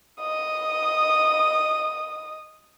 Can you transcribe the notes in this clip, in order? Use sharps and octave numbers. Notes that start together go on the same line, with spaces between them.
D#5 D#6